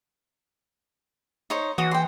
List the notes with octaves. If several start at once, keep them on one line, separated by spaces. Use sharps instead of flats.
D#4 C5 C#5
E3 F#4 D#6
G5 C6